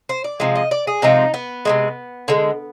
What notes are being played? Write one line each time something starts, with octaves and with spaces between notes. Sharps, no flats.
C5
D5
C3 F3 G#3
D#5
D5
G#4
C3 F3 G#3 D#4
B3
C3 F3 G#3
D3 G#3